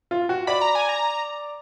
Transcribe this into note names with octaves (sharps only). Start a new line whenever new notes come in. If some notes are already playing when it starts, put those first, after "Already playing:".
F4
F#4
D5 B5
A#5
G#5
A#5